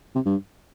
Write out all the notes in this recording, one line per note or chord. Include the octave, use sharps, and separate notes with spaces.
C3
G2